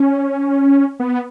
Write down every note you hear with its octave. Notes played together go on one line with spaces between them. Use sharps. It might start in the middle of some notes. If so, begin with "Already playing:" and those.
Already playing: C#4
B3